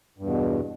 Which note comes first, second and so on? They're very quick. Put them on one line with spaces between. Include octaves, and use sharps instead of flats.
G2 E2 B2